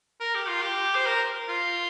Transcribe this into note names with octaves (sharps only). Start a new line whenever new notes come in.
A#4
G4
F4
G4
C5
A#4
F4